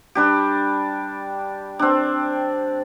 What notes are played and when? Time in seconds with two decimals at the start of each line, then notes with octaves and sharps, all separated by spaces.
0.15 G3 D4 G4
1.79 C4 D4